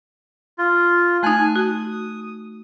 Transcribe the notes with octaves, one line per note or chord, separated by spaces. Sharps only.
F4
A3 D#4 G#5 F#6
F#4 D#6